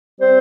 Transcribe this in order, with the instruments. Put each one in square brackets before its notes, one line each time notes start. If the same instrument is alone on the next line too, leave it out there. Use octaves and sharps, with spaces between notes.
[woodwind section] G3 C4 C5